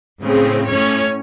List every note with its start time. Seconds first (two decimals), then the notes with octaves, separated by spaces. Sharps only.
0.21 A2 C#3 C4
0.67 A2 C#4 C#5